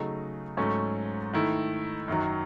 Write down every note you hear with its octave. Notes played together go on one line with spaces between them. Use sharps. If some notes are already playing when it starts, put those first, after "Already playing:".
Already playing: C#3 F#3 A3 D#4
G#2 F#3 A3 C#4
D#3 A3 E4
F#2 D#3 F#3